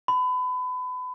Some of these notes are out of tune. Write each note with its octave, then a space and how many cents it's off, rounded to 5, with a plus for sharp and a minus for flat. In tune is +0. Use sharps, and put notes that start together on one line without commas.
B5 +30